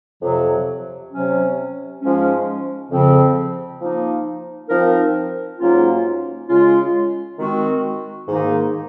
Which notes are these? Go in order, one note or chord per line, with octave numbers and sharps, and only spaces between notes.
F2 C3 F#3
C3 F#3 C#4
G#2 F3 G#3 C#4
F2 C#3 F3 C4
F3 A#3 D#4
F3 C4 D#4 A#4
G#2 F#3 A#3 C#4 F4
C#3 G#3 C#4 F4
D#3 G#3 C4 F#4
G#2 D#3 A#3 D#4